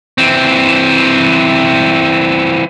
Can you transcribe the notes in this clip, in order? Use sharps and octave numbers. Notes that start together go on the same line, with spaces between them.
E3 C4